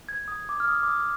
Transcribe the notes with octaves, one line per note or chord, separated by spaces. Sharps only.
G#6
D#6
D6
F6
D#6
D6
D#6